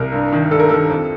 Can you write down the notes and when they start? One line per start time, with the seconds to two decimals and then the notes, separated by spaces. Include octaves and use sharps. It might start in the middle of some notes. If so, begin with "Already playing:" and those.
Already playing: C2 A#4
0.12 G2
0.33 D#3
0.51 G2 A4
0.60 A#4
0.69 D#3 A4
0.89 F2